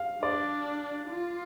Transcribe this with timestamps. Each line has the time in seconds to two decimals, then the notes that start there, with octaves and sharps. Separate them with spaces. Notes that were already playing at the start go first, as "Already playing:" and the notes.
Already playing: F5
0.23 D4 D5
1.10 F4